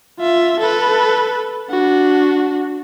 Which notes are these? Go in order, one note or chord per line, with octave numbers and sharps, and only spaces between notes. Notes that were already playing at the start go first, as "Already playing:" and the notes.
F4 E5
A4 B4
D4 F#4